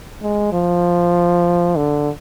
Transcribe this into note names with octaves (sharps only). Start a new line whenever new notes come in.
G#3
F3
D3